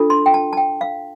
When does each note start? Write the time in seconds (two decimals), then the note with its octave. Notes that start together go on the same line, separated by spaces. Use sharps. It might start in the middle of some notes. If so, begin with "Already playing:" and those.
Already playing: D4 F4 A4
0.10 C6
0.26 G5
0.34 A5
0.53 A5
0.57 G5
0.81 F5